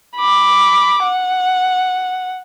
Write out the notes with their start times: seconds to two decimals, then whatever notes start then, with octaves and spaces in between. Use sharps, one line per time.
0.16 B5 D6
1.03 F#5